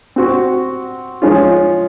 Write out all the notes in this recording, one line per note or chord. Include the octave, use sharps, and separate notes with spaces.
C4 F#4 C5
F3 G#3 C#4 F4